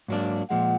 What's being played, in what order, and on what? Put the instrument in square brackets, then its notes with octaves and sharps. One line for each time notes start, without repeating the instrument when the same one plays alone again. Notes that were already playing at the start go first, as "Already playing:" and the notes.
[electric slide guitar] G#2 F#3 A#3 D4
[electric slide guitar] A#2 F3 G#3 [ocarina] F#5